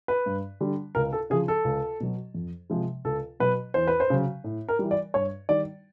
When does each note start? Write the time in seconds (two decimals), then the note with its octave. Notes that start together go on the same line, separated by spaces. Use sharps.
0.08 B4
0.26 G2
0.60 D3 G3
0.95 C#2 A#4
1.13 A4
1.30 C#3 F3 G#4
1.48 A4
1.65 C#2
2.00 B2 F#3
2.34 F2
2.70 C3 F3 G#3
3.05 C#2 A4
3.40 B2 F#3 B4
3.74 E2 C5
3.87 B4
4.00 C5
4.10 C#3 F#3
4.44 A2
4.69 A#4
4.79 E3 G3
4.91 D5
5.14 G2 C#5
5.49 D#3 G3 D5